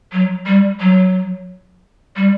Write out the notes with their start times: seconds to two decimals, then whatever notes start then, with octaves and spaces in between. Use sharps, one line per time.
0.12 F#3
0.46 G3
0.80 F#3
2.16 G3